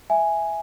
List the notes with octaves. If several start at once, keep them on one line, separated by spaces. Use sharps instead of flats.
E5 G#5